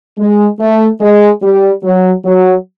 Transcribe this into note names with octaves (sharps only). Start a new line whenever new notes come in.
G#3
A3
G#3
G3
F#3
F#3